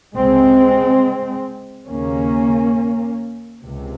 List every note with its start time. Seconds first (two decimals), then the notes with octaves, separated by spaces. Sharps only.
0.15 C#2 C3 G#3 C4
1.88 D#2 C#3 A#3 C#4
3.61 C#2 C3